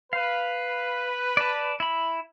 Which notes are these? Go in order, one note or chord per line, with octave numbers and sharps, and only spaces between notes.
B4 F5
D5 A5
E4 B5